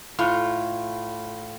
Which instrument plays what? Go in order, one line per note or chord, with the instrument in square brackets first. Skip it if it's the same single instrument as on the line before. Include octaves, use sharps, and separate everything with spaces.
[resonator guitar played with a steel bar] A2 F4